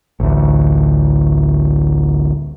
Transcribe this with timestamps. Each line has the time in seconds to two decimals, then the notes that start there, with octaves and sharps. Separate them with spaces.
0.20 A1 D2